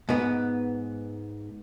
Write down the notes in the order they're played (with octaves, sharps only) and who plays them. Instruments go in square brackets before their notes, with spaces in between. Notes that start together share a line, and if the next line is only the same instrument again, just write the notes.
[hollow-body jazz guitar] G#2 B3